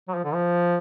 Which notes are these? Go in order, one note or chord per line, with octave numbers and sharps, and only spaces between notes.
F#3
F3
D3
F3